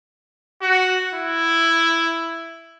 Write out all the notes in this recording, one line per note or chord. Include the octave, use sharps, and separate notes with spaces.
F#4
E4